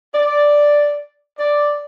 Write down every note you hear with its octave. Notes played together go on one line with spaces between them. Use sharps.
D5
D5